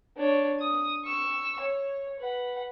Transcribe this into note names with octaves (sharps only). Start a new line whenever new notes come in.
D4 C#5
D#6
C#6 E6
C#5
B4 F#5